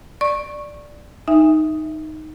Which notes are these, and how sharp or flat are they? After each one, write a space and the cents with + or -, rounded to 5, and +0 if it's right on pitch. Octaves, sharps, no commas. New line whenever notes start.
D5 +0 C#6 -10
D#4 +0 E5 +0 G#5 -30